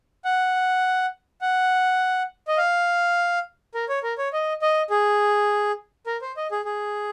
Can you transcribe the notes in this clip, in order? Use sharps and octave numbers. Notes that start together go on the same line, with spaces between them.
F#5
F#5
D#5
F5
A#4
C#5
A#4
C#5
D#5
D#5
G#4
A#4
C5
D#5
G#4
G#4